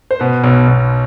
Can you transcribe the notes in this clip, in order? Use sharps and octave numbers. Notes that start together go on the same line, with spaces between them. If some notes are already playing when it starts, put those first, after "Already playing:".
C5
B2 B4
B1
B1